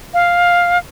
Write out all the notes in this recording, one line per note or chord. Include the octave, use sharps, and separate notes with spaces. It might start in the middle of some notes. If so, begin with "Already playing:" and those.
F5